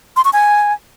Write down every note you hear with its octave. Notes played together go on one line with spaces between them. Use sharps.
C6
C#6
G#5